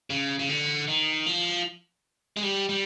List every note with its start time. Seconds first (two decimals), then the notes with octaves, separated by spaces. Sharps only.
0.10 C#3
0.40 C#3
0.49 D3
0.88 D#3
1.26 F3
2.37 G#3
2.43 G3
2.69 G3